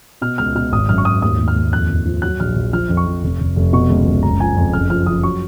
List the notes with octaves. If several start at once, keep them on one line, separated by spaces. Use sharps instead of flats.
B2 F6
C#2 F6
B2 F6
G#1 D#6
F#2 F6
C#6
G#1 D#6
D#2 D#6
D#2
F6
D#2
F2 F#6
F2
F3
F#3 F#6
A#1 F6
A#1
F3 F6
F2
C#6
F3
F1
F1
F1
B2 C#6
C#2
C#2
F#1 A#5
F3 G#5
F2
F#1 F6
F3 F6
F3 D#6
F#3 C#6